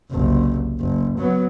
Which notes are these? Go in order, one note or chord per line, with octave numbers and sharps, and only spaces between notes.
F#1 C2
F#1
F#3 B3